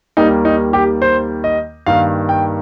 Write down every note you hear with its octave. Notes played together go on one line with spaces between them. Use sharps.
D#2 D#3 G3 A#3 D#4
D#4
G4
C5
D#5
G2 D#3 A#3 F5
G5